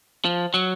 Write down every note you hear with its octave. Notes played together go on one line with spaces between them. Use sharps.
F3
F#3